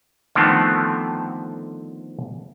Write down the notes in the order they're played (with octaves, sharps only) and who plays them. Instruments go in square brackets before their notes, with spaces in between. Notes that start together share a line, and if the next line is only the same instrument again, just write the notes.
[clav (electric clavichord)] D3 D#3 F3 A3 B3 C4